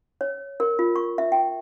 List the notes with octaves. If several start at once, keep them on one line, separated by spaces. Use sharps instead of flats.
C#5
A#4
F4
C#6
E5
G5